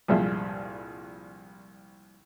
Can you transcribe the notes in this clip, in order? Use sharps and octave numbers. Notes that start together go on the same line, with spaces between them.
C2 G2 A#2 F3 G#3 E5